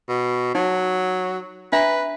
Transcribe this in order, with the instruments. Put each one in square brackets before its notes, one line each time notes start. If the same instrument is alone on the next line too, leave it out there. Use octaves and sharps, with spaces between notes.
[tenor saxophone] B2
[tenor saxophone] F#3 [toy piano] D#4
[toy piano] D4 E5 A#5 [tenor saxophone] B4